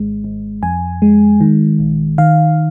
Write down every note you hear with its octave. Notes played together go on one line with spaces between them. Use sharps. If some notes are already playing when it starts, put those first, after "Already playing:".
Already playing: G#1 G#3
G#1
F2 G#5
G#3
D#3
A#1
D#3 F5